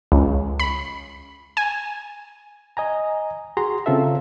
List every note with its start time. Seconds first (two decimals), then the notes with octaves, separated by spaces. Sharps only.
0.12 C#2
0.60 B5
1.57 G#5
2.77 D#5 G#5 A#5
3.57 F#4 G#4 A#5 C6
3.86 C#3 C4 F4 A4 E5